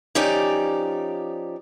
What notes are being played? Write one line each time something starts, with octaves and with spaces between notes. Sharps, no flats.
F3 C#4 D#4 G4 D5